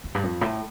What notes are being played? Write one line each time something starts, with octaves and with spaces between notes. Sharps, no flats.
E2
G2
F2
A2